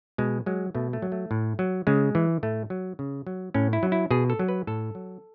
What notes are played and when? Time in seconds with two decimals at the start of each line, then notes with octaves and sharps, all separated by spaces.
0.18 B2 G#3
0.46 F#3 G#3
0.75 B2 A3
0.93 A3
1.02 F#3
1.12 A3
1.31 A2
1.59 F#3
1.87 C#3 G#3
2.15 E3
2.43 A2 A3
2.70 F#3
2.99 C#3
3.27 F#3
3.54 A2 C#4
3.73 E4
3.83 F#3
3.92 E4
4.11 B2 G#4
4.30 A4
4.39 F#3
4.49 B4
4.67 A2 A4
4.95 F#3